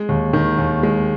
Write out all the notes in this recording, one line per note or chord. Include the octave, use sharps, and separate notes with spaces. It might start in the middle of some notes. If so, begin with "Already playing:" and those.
Already playing: G#3
D#2
D#3
D#2
G#3